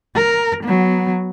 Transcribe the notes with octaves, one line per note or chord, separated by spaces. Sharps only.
A#4
F#3 B3